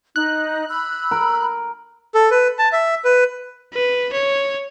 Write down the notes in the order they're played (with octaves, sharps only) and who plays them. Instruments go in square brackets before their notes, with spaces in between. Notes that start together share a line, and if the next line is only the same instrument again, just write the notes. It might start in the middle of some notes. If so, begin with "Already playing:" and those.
[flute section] D#4 [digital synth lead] F#6
[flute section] B5 E6
[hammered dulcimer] A#4
[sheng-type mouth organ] A4
B4
A5
E5
B4
[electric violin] B4
C#5